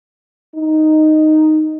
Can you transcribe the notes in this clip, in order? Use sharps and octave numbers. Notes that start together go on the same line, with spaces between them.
D#4